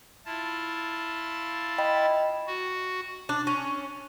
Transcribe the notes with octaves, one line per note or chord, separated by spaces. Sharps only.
E4 F4 A5
D#5 G5 B5
F#4
D4
C#4